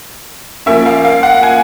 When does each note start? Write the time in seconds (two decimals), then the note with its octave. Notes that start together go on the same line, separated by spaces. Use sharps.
0.66 F3 A#3 C#4 E5
0.86 F5
1.05 F5
1.23 F#5
1.43 G#5